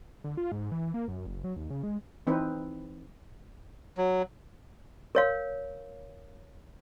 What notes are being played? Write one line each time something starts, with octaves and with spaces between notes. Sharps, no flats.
D3
F4
G#2
E3
A#3
F#2
F#1
F#3
D#2
C#3
G#3
E3 C4 D#4 B4
F#3
A#4 C#5 F5